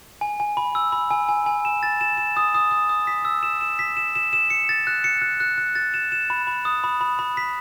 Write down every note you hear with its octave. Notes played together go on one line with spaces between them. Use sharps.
G#5
G#5
B5
E6
B5
G#5
G#5
G#5
E7
A6
E7
E7
D#6
D#6
D#6
D#6
B6
E6
E7
E7
B6
E7
E7
E7
C#7
A6
F#6
C#7
F#6
F#6
F#6
A6
E7
E7
B5
B5
D#6
B5
B5
B5
B6